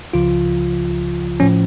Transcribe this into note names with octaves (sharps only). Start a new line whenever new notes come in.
C#2 C#3 F3 F4
A2 F3 C#4